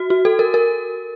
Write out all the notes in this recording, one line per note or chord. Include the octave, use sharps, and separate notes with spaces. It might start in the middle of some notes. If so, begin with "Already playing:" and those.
Already playing: F#4
F#4
A4
A#4
A#4